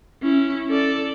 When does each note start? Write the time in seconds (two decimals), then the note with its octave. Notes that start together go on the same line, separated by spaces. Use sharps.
0.22 C#4 E4
0.70 A4 D5